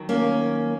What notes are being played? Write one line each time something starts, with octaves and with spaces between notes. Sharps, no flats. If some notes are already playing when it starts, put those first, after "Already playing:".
Already playing: D#2 D#3 F#3
A#3 C#4